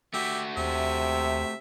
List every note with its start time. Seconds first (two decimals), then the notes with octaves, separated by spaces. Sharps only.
0.14 A3 F#4 G4 E5
0.57 D#2 C3 E5